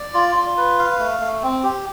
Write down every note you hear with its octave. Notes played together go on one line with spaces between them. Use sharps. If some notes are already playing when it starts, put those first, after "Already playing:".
Already playing: D5
F4
F4
B4
F5
A3
A3
C4
G4